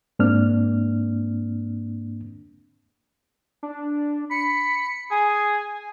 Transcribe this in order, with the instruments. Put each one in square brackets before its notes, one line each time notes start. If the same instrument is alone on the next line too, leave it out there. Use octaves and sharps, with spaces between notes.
[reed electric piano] G#2 A#3 C4 D4 F6
[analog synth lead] D4
[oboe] B5 [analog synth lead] C#7
[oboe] G#4 [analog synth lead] G#5